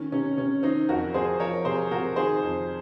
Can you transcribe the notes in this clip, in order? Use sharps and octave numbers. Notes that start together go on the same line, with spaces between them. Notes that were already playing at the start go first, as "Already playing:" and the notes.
Already playing: D#3 C#4
C3 C#4
C3 C#4
D#3 C4 D#4
F2 F#4 A#4
F2 G#4 C5
F3 A#4 C#5
C3 G#4 C5
C3 F#4 A#4
D#3 G#4 C5
F2